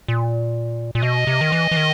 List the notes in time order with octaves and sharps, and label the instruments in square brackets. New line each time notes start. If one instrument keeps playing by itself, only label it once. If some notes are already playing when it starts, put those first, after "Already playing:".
[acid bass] A#2
A#2
[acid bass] B2 [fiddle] D#5
[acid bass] C3
D#3
E3
E3
D#3